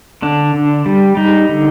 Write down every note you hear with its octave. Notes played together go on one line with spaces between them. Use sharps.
D3 D4
D3
G3
G3 D#4
D3